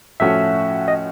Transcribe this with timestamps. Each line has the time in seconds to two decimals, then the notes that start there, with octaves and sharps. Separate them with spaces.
0.20 A2 F3 A3 C#4 F#4 E5
0.88 D#5